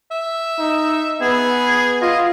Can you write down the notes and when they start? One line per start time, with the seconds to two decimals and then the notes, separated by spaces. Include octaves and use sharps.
0.11 E5
0.59 D#4
1.21 B3 G#4
2.02 F4 D#5